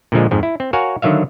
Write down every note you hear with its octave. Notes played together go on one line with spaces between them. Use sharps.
A#2 D3 F3 G#3
F2 G#2 F3
E4
C4
F#4 A#4 C#5 F5 F#5 G#5
D3 D#3 F#3 E5 F5